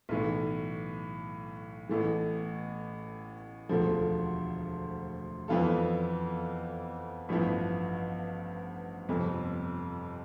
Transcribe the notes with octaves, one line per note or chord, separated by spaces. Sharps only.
B1 A2 E3 A3
A1 A2 E3 A3
E1 D2 D3 F3 A3
F2 E3 B3 F4 A4
A1 G2 F3 B3 E4
G1 F2 C3